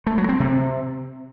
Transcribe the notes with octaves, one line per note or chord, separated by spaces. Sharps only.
A3
F#3
C4
C3